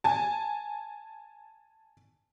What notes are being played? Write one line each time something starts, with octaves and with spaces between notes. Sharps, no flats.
G#5 A5